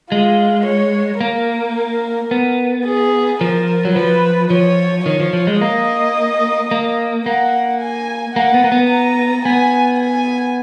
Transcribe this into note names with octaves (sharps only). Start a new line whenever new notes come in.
G#3 F4
C#5
A#3 A#4
B3
G#4
F3 A#4
F#3
F3 B4
F3 C#5
D#3 C#5
F3
F3
G#3
A#3 D#5
A#3
A#3 F#5
G#5
A#3 F#5
B3
A#3
B3
A#5
B3 G#5
G#5